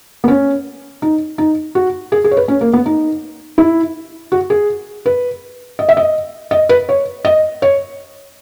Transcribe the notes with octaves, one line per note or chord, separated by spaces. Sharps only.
B3
C#4
D#4
D#4
F#4
G#4
G#4
C#5
B4
C#4
A#3
B3
D#4
E4
F#4
G#4
B4
D#5
E5
D#5
D#5
B4
C#5
D#5
C#5